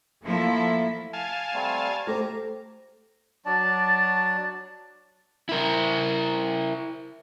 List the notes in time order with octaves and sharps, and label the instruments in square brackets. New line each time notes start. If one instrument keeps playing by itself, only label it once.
[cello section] F3 A3 A#3 E4 A4 E5
[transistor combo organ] F5 G#5 A5
[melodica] G3 A3 C4
[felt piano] A3 C5 [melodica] G4 A#5
[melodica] F#3 D4 D5 A5
[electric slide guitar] E4 A#4